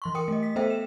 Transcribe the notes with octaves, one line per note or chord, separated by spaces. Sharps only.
E3 C6 C#6
A#4 G5 D#6 C#7
A3 D#5
B6
B3 A4 C5 E5 G5
E7